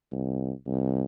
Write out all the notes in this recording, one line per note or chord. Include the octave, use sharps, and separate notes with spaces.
C2
C2